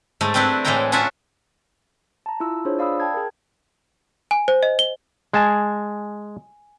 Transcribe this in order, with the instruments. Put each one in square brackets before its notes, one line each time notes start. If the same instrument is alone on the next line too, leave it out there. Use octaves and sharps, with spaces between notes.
[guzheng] G#2 G#3 A3
G3 C4 D4 E4 B4
A2 E3 G#3 E4 G5 A#5
C#4 D4 F4 E5 F#5 G#5
[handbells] A5 A#5
E4 F4 E6
D4 F4 G#4 C5 C#5
D5 F5 B5 D#6 E6
G5 A5 G#6
G#4 A#4
[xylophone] G#5
C5
D#5
G7
[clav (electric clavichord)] G#3 A5 [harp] G#5